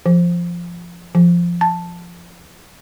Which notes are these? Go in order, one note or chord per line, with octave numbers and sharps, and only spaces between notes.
F3
F3
A5